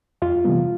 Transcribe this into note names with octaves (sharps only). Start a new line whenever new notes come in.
F2 F4 F5
C3 E3 G3 B3